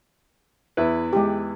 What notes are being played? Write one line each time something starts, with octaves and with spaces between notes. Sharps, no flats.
E2 E4 B4
G#3 G4